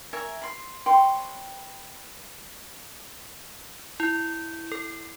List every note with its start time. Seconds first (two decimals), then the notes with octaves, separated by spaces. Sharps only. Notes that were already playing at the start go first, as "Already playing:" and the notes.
0.13 A#4 C#5 E5 G#5
0.42 B5 C6
0.86 B4 C#5 G5 C6
4.00 E4
4.72 A4